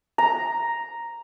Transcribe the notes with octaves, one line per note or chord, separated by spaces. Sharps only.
A#5